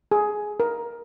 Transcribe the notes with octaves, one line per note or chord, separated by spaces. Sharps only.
G#4
A#4